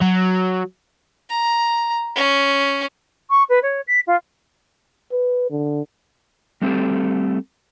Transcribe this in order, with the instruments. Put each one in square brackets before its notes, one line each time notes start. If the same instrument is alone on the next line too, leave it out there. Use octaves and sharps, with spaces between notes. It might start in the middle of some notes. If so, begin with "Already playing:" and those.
[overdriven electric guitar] F#3
[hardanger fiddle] A#5
C#4
[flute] C#6
B4
C#5
B6
F4
[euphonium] B4
D3
[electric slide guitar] G3 A3 C4 F4 G4 A4